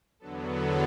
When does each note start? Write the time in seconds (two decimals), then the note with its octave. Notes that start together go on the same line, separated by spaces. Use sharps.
0.19 E2 D3 F#3 B3 A4
0.49 A4